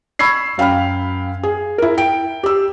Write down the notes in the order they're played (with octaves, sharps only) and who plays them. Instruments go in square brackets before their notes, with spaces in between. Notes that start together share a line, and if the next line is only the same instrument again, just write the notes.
[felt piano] B5 C#6 E6 G#6 C7
F#2 F5 G5 B5 F6
G#4
E4 A#4
G5 D7
G4 E6